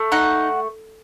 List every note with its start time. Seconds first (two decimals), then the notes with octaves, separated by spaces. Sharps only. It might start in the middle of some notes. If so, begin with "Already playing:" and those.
Already playing: A3
0.12 D#4 F#5